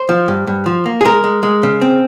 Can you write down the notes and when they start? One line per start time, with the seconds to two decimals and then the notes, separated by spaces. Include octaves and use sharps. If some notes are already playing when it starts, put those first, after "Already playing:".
Already playing: C5
0.09 F3
0.28 G2
0.47 G2
0.66 F3
0.86 A#3
1.01 G#4
1.05 G#3 A#4
1.24 G#3
1.43 G#3
1.63 C#3
1.81 C4